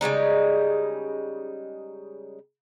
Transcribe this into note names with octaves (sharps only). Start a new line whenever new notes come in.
C#3 G3 G#3 D#4